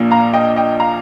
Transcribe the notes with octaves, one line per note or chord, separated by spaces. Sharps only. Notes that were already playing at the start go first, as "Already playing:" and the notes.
Already playing: A#1 A#2 A#3
F5 A#5
D#5 G5
D#5 G5
F5 A#5